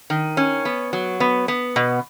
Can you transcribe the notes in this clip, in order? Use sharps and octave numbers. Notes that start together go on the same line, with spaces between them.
D#3
C#4
B3
F#3
B3
B3
B2